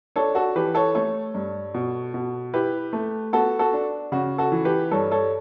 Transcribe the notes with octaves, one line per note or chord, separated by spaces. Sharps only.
D4 A4 C#5
F#4 A4
E3 G4 B4
A4 C#5
A3 A4 C#5
G2
B2
B2
E4 G4 B4
A3
B3 F#4 A4
F#4 A4
D4
C#3 F#4
F#4 A4
E3
G4 B4
G2 A4 C#5
A4 C#5